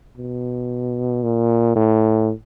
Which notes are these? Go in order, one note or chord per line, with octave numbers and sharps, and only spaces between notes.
B2
A#2
A2